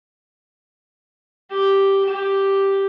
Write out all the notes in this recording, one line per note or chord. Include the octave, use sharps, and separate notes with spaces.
G4
G4